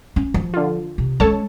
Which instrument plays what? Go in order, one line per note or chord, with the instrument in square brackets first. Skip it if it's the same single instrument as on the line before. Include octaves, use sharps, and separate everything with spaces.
[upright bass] C#4
F3
[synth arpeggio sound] D3 F4
[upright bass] C3
[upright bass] G#3 C#4 [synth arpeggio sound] A4 C#5 A5